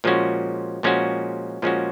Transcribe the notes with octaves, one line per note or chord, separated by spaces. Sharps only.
A#2 F3 G#3 C#4 F#4
A#2 F3 G#3 C#4 F#4
A#2 F3 G#3 C#4 F#4